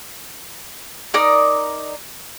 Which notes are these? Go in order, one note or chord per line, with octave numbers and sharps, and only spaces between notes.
D#4 A#4 D5 D#6